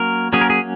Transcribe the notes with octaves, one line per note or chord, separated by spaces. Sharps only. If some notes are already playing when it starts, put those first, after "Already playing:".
Already playing: F#3 A#3 C#4 A#4
F#3 A#3 C#4 G#4
A#4
G#4